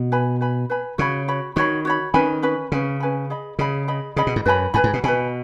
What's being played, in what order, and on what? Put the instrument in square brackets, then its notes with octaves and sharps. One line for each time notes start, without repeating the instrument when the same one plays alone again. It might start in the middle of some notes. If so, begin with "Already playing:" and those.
Already playing: [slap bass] B2
[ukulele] B4 G#5 B5
B4 G#5 B5
B4 G#5 B5
[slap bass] C#3 [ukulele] F#4 C#5 B5
[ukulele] F#4 C#5 B5
[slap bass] D#3 [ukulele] F#4 C#5 B5
[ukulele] F#4 C#5 B5
[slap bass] D#3 [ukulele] C#4 B4 G#5 B5
[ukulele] C#4 B4 G#5 B5
[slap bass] C#3 [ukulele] C#4 B4 G#5 B5
[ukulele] C#4 B4 G#5 B5
G#4 D#5 B5
[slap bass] C#3 [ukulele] G#4 D#5 B5
[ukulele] G#4 D#5 B5
[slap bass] C#3 [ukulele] G#4 D#5 B5
[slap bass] B2
G#2
[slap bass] F#2 [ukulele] B4 G#5 B5
[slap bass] G#2 [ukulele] B4 G#5 B5
[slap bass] G#2
B2
[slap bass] B2 [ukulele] B4 G#5 B5